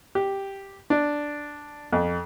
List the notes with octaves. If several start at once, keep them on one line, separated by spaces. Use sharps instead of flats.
G4
D4
F2